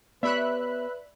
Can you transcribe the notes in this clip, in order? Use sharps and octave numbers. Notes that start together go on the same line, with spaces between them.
B3 G4 B4 C#5 D5 E5 B5 F#6